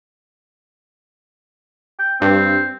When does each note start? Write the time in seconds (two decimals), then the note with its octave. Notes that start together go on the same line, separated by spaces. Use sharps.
1.99 G5
2.21 G2 C4